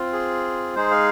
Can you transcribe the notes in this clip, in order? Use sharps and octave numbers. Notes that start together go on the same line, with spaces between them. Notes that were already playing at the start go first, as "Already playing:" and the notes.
Already playing: C4 F4
G#4
G#3 D#4 G#4 C5
F5